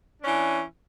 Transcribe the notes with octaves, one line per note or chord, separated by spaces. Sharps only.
E3 C#4 D4